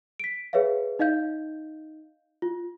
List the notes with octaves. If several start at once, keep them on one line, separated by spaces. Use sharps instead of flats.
B6 D7
G#4 B4 C#5 E5 F5
D#4 D#5 F5 G6
F4